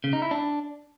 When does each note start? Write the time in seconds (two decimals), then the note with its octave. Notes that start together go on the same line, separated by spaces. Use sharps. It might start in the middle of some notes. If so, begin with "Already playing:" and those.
0.04 C#3
0.13 D#4
0.22 E4
0.31 D4